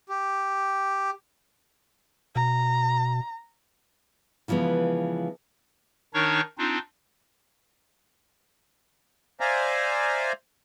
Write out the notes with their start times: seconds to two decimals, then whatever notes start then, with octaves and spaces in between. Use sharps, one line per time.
0.09 G4
2.36 B2 A#5
4.48 C#3 E3 F3 G#3 B3
6.14 D#3 D4 D#4 A#4 C#5 C#6
6.58 C4 D4 D#4 F4
9.40 C5 D5 E5 F5 G#5 A#5